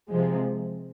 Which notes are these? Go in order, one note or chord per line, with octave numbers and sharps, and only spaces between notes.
C3 F3 G#3